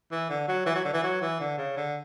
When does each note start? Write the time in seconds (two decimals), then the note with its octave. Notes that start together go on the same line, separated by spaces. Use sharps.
0.11 E3
0.29 D3
0.48 F#3
0.66 E3
0.75 F#3
0.84 D3
0.93 E3
1.03 F#3
1.21 E3
1.40 D3
1.57 C#3
1.77 D3